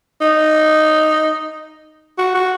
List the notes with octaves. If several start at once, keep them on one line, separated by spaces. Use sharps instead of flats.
D#4
F#4
F#4